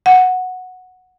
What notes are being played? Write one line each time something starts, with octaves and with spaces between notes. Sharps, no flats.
F#5